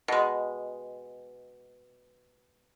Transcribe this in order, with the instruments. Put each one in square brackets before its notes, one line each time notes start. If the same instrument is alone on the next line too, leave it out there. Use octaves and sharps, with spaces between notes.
[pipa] B2 G#3